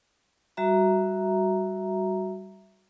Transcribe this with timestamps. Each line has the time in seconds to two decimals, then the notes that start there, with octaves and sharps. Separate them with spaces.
0.57 G3 F#4 E5 A#5